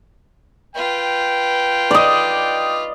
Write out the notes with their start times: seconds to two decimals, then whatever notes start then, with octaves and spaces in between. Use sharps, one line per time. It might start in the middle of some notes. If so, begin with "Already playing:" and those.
0.75 F4 B4 G5
1.91 D5 D#5